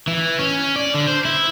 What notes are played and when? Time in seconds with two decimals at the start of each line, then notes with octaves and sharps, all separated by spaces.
0.08 E3
0.39 C#4
0.76 D5
0.94 D3
1.08 C5
1.25 E4